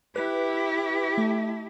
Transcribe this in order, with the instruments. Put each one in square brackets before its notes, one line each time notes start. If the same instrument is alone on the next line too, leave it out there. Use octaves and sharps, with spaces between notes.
[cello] E4 G4 [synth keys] B4
[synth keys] A3